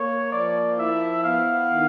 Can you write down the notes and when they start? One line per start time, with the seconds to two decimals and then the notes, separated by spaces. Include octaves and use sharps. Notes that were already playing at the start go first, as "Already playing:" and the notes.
Already playing: A#3 C#5
0.32 F3 D5
0.79 E4 E5
1.24 B3 F5
1.70 D#3